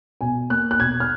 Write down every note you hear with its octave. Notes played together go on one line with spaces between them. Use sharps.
B2 G#5
A#3 F#6
F#6
B2 G#6
F6